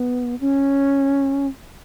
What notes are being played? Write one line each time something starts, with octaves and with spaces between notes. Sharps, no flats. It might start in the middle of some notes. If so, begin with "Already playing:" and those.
Already playing: B3
C#4